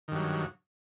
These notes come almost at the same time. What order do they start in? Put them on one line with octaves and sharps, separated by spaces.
D#3 G2 F#3